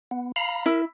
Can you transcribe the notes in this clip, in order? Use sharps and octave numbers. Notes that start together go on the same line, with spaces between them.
B3
F5 A#5 B5
E4 A#4 E5